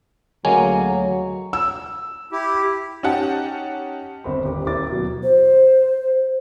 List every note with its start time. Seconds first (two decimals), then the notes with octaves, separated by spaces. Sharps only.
0.45 D2 F#3 G#3 A#3 C#4 F#4 G#5
1.53 E6
2.32 E4 G4
3.03 C#4 D#4 G4 F#5 A5
4.24 G1 C4 B5
4.44 D#1 G4
4.66 D#1 E4 D6 A6
4.90 B2 F#3
5.23 C5